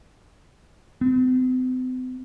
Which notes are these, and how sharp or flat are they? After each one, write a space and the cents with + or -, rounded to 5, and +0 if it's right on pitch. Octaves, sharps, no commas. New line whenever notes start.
C4 -45